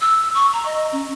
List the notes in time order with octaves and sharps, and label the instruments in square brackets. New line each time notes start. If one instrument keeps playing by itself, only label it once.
[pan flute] E6
C#6
A#5
D#5
C#4